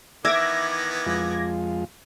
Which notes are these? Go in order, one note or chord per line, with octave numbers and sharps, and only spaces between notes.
D#3 E3 B3 E5 D6 G#6 A#6
F2 G#3 F4